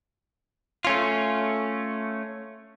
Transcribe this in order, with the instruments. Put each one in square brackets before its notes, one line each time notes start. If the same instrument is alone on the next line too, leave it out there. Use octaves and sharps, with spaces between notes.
[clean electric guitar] A3 C#4 F4